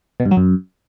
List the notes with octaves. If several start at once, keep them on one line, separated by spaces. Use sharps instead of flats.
B2
G2
F#3
F#2